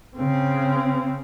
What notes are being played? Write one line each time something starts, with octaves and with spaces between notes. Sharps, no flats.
C#3 C4